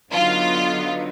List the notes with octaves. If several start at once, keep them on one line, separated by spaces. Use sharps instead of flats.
D3 F#3 B3 D#4 F4